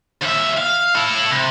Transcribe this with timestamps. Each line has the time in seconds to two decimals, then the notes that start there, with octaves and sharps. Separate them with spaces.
0.22 D#2 E5
0.58 F5
0.95 E4 A4
1.31 C3